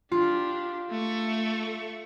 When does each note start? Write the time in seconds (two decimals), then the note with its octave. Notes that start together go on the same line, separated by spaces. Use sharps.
0.12 D4 F4 G4
0.90 A3 C#6